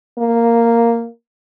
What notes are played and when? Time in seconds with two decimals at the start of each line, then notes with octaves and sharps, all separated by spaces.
0.18 A#3